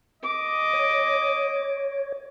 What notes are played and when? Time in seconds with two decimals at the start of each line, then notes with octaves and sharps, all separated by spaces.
0.23 D#5 D6
0.73 C#5